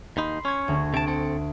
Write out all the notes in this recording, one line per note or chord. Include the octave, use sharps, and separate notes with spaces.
D#2 D#4 B5 C6
C#4 C#6 G#6
D2
C3 A5 D7
C4 A4